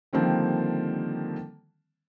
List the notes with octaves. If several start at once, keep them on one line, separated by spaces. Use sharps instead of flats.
D3 D#3 F3 G3 A#3 C4